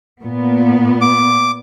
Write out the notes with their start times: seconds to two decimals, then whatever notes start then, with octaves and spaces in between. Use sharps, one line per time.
0.22 A#2 B3
1.01 D6